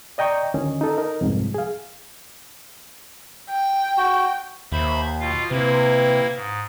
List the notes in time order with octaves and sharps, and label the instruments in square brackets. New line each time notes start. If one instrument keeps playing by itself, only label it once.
[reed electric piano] D5 D#5 G5 A#5 C#6
D2 D#3 C#4 D#5
D#4 A4
D#4 A#4
C2 F2 G#2
G#4 F5
[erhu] G5
[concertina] F#4
[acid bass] D#2 [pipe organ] C5 E5 B5
[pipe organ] B2 F4 F5
[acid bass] C3 [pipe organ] A#3 E4 [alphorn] B4
[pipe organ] G#2